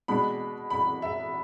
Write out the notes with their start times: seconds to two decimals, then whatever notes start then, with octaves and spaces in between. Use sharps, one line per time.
0.08 B2 G#3 D4 B5
0.70 B5
1.02 E5